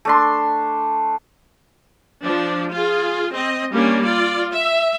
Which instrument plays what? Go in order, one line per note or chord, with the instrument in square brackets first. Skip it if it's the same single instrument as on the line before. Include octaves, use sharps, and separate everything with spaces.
[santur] A3 D4 C6
[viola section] F3 D4
F4 G#4
C4 D#5
G3 A#3 C#4 D4
F4 D5
E5